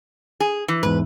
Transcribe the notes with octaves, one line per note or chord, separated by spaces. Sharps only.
G#4
E3
E2 G#2 B4